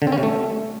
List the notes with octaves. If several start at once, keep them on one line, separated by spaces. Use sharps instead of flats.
D3
C4
C#4
C3
A3